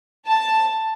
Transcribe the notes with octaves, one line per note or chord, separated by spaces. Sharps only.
A5